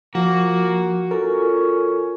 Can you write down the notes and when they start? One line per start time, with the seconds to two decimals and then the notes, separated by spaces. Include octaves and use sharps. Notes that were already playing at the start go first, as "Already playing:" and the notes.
0.15 F3 A#3 F#4
1.11 C#4 F4 A4 A#4